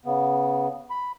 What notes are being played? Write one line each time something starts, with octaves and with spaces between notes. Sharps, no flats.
C#3 B3
B5